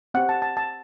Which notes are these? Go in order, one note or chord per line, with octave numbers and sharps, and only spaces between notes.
C4 G4 F#5
A5
A5
A5